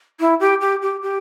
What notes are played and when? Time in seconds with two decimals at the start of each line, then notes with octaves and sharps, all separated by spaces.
0.20 E4
0.40 G4
0.61 G4
0.82 G4
1.02 G4